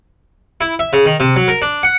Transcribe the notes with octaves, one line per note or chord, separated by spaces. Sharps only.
E4
E5
C#3
D#3
C3
F#3
A#4
D4
F#5